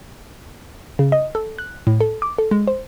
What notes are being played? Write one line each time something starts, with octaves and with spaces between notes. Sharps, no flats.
C#3
D#5
A4
F#6
A2
A4
D6
A4
G#3
C5